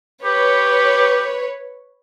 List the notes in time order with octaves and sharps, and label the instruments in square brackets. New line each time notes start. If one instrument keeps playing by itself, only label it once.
[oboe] G4 [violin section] B4 C#5